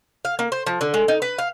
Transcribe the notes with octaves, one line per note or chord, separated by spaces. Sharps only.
F5
A#3
C5
F3
D3
G#3
D#4
B4
F5